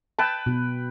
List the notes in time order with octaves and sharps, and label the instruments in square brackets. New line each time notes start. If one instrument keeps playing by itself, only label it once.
[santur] B4 G5 [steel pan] A5 E6
[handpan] B2